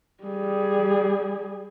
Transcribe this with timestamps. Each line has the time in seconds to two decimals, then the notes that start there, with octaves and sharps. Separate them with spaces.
0.24 G3 G#4